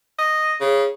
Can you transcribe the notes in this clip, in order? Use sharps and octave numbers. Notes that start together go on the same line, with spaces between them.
D#5
C#3